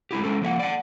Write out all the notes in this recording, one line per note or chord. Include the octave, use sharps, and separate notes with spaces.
G#3 A3 E4 G4
G#3 C#4 A4
F3 A#3 E5 F#5
D5 F#5